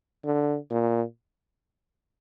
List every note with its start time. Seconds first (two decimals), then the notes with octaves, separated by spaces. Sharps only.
0.25 D3
0.71 A#2